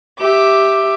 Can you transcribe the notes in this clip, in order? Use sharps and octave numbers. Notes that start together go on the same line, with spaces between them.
G4 E5 D6